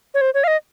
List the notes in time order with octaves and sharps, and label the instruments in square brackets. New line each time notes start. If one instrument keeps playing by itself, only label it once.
[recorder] C#5
C5
C#5
F5
D#5